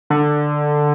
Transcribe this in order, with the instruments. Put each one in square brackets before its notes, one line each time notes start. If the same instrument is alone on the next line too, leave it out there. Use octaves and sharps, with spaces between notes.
[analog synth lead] D3